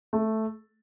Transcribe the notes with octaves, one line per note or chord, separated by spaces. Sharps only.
A3